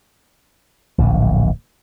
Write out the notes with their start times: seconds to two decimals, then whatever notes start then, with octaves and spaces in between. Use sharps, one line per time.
0.98 D1 A#1